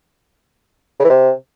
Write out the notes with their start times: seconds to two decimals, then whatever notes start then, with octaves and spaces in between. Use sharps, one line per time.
0.99 C#3
1.04 E3
1.10 C3